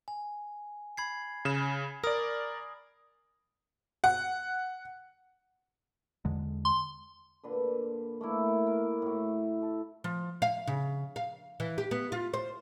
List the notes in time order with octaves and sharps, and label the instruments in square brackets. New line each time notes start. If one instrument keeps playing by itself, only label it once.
[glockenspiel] G#5
B5 G#6 C7
[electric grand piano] C#3 E7
[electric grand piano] A#4 D5 [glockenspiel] D#6
[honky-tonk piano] F#5
[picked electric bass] E2 D3 G#3
[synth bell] C6
[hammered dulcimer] A#2 D3 B4
A3 A#3 E4
A#4
A2 F#4
A4
[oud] F3
F5
C#3
F5
E3
G4
B3
F4
C5